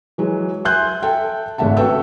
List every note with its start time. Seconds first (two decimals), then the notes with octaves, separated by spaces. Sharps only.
0.18 E3 F#3 G#3
0.65 E5 G#5 C6 F#6 G6
1.02 A4 E5 G5
1.58 G#1 C#3 A3 E5 F#5 A5
1.77 F#4 A4 B4 E5 G5 E6